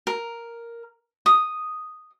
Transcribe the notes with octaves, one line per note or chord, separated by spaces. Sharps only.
A#4
D#6